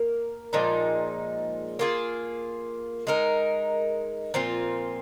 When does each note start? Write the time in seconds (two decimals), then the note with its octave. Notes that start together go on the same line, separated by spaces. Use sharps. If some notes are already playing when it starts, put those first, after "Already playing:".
Already playing: A#3 A#4
0.53 A#2 F3 G#3 D#4
1.79 A#3 F4 G#4
3.07 G#3 D#4 A#4
4.34 A#2 F3 C4 F4